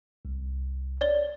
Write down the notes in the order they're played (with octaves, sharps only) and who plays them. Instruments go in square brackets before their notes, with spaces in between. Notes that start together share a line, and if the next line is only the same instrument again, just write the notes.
[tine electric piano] C2
[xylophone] C#5 D5 G7